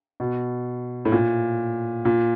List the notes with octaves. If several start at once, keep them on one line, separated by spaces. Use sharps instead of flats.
B2
A2
A#2
A#2